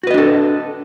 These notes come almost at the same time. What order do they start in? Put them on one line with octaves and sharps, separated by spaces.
F#4 B4 D#5 D4 A4